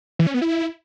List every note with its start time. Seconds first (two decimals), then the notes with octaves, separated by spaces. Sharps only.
0.19 E3
0.27 C#4
0.34 B3
0.42 E4